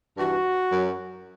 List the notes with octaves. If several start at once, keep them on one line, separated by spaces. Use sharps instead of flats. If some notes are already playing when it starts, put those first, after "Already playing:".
G2 E3 F#4
F#2 F#3